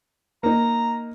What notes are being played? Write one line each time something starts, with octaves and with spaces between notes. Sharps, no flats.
A#3 D#4 A#5